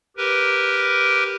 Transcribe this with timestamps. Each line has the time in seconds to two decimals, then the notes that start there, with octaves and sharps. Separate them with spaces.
0.17 G4 A#4 B4